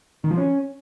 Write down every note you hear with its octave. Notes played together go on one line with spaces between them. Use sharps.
D#3
F3
C#4